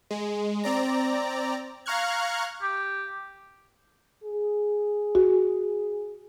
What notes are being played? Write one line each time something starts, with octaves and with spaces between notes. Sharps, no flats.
G#3
C4 D5 A#5
F5 A#5 C#6 F6 F#6 G#6
G4
G#4
F#4